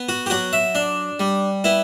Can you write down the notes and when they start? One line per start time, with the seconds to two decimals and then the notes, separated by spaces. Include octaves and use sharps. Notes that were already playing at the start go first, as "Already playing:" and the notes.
Already playing: B3
0.09 F#4
0.26 G4
0.30 F#3 F#4
0.53 E5
0.75 D4
1.20 G3
1.64 B3 E4